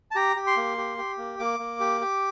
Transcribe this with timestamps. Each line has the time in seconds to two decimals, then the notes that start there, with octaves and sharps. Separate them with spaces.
0.11 A5
0.16 G4 A#5
0.36 G4
0.47 C6
0.57 A#3
0.77 G4
0.98 G4
1.18 A#3
1.39 A#3 D6
1.59 A#3
1.80 G4
2.01 G4